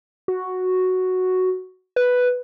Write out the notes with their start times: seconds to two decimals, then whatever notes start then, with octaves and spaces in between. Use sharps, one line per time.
0.28 F#4
1.96 B4